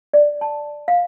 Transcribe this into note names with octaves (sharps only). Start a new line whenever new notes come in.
D5
A5
F5